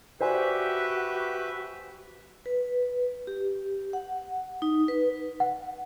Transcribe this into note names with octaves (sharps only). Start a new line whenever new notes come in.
F#4 G4 B4 C5 D5 E5 G#5
B4
G4
F#5
D#4
B4
F#5